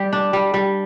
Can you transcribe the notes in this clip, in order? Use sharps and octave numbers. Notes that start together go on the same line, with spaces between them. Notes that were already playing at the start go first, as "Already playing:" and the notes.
Already playing: G3 G4
D4
G3
G3